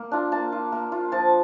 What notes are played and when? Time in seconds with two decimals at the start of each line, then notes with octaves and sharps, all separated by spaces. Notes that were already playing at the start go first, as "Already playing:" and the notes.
Already playing: A#3
0.11 D4 F4
0.32 A#3 A5
0.52 F4
0.72 A#3
0.92 F4
1.12 F3 A5